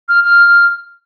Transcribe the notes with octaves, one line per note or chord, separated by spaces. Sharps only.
F6
F6